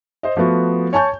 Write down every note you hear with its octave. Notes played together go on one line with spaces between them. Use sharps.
C5 D#5
F3 A3 B3 F#4
C#5 G#5 A5 C#6 G6